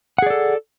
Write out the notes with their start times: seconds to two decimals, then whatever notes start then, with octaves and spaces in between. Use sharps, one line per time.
0.18 F#5
0.22 G#4
0.26 D5
0.30 A4